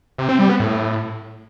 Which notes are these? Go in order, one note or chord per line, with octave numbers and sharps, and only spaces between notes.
C3
C4
G3
B3
A2